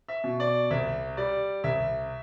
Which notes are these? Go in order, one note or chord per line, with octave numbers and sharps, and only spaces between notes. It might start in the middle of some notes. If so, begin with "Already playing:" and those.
E5
B2
D5
C2 E5
G3 D5
C2 E5